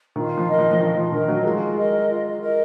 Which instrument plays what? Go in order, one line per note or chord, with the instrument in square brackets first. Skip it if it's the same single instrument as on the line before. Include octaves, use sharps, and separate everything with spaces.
[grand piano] D#3 [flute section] F4
[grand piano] F3
[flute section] A#4 D#5
[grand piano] F3
F3
[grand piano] D#3 [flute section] F4
[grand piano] F3
[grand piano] D#3 [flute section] A#4 D#5
[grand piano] F#3
[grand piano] G#3 [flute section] F4
[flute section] A#4 D#5
F4
A#4 D#5